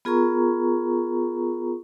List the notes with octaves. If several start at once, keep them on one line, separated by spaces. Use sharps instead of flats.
B3 F4 G#4 A#4 A#5 C#6